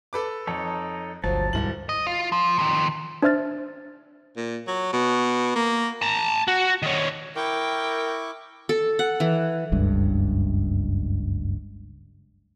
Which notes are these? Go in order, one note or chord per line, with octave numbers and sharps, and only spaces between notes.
A4 B4 D6
F2 D#4 A4 C#5
G1 D2 F3 F#3 C5 A5
E1 D2 G#2 G3 E4 F#7
D#5
F4
F3
D#3 F3
D4 C5 E5 F6 A6
A#2
F#3
B2
A#3
A5 A#5
F#4
D#3 C#4
E4 A#4 G5 C#6 D6
A4
F#5
E3
F#1 C#2 G2